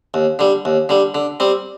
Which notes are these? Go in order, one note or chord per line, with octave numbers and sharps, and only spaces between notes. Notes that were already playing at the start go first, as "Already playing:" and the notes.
D#2
D3 G3
D#2
D3 G3
D3
G3 C4